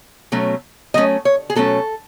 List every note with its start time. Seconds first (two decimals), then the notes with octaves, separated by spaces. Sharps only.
0.32 B2 F#3 A3 C#4
0.94 B2 F#3 A3 C#4 D#5
1.25 C#5
1.50 G#4
1.55 B2 F#3 A3 C#4 A4